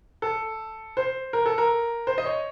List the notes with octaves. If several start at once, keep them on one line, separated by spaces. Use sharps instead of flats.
A4
C5
A#4
A4
A#4
C5
D#5
C#5